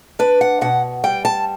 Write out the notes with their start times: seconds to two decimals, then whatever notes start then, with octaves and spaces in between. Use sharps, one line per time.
0.19 D4 B4
0.41 F#5
0.61 B2 F#5
1.04 G3 G5
1.25 A5